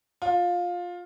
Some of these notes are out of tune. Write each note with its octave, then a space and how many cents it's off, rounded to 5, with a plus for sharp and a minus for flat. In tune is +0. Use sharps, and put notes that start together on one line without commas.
F4 +15